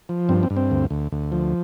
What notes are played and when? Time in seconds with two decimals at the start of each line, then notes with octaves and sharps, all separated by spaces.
0.09 F3
0.29 G2 C4
0.43 C4
0.50 G2
0.56 C4
0.71 D2
0.91 D2
1.12 D2
1.32 F3